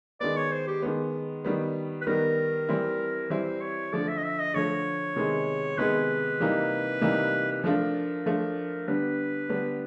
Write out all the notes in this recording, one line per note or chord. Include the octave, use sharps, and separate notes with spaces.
D#3 G#3 B3 D5
C#5
C5
G4
D#3 G#3 B3
D#3 G3 B3
B4
D#3 G3 B3 A#4
E3 G3 C4 E4
E3 G3 C4 E4 C5
C#5
D3 F3 A3 D5
E5
D#5
E5
D#5
D3 F3 A3 C#5
C3 D#3 G#3 B3
C3 D#3 G#3 B3 B4
C3 E3 G3 A#3 D#4
C3 E3 G3 A#3 D#4
B4
F3 A3 D4 F4 A#4
F3 A3 D4 F4
D3 G3 B3 D4 B4
D3 G3 B3 D4